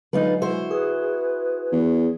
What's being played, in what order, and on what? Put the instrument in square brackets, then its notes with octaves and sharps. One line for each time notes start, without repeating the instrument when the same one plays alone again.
[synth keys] D3 F#3 G#3 [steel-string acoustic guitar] D#4 F4 B4
[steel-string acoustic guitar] E4 F#4 C5
[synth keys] G#4 [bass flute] B4
[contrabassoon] E2